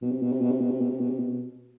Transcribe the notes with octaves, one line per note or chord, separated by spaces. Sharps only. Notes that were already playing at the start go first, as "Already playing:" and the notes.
B2
C3
B2
C3
B2
C3
B2
C3
B2
C3
B2
C3
B2